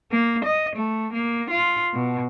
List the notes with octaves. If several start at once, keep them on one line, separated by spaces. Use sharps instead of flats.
A#3
D#5
A3
A#3
F4
B2